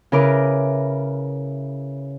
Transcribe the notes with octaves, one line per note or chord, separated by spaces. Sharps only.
C#3 E4 A#4 B4 D6